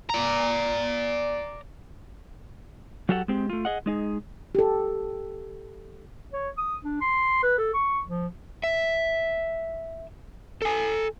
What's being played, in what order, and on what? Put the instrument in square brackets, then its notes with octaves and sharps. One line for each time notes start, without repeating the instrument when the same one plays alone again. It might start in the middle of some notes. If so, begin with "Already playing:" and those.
[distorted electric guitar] D5 A#5
[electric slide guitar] F#3 F#4 G4 A4 F5 F#5
G#3 C4 G4
A3 F4
G#4 D#5 F#5
G#3 D#4 G#4
[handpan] G4 A4
[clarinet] C#5
D#6
D4
C6
B4
A4
C#6
F3
[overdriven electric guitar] E5
A4 G#5